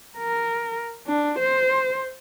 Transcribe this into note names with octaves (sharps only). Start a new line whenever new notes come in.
A#4
D4
C5